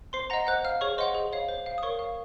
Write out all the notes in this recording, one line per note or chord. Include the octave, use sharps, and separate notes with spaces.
C5 C6 C7
D#5 F#5 A#5 A#6
C5 F#5 F#6
F5 F6
G#4 C#5 C#6
C5 D#5 F#5 C6
G#4
C#5 F5
C5
F5
D#6
A#4 C#5 C#6
F5